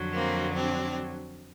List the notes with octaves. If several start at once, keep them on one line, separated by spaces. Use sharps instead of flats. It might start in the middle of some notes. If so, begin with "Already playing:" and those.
Already playing: F2 D3 F#3
A#3 C4
C4 D4